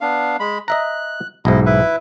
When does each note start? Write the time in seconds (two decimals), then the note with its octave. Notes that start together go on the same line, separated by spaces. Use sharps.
0.01 B3 D4 F5
0.40 G#3 B5
0.68 D#5 E5 A#5 F#6
1.45 B1 G#2 E4 D#5
1.66 E4 B4 E5